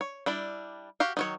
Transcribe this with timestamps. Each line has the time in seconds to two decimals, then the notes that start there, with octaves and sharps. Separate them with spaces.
0.01 C#5
0.26 G3 D4 E4
1.00 F#4 G4 F5
1.17 D#3 F#3 C#5